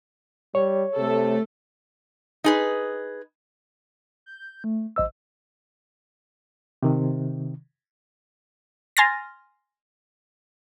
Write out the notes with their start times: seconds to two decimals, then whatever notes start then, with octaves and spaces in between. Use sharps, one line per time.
0.55 G3 C#5
0.97 C3 A3 A4
2.44 D#4 G#4 B4
4.26 G6
4.64 A3
4.96 A1 C5 D#5 E6
6.83 C3 D#3
8.97 G#5 C6 F6 A6 A#6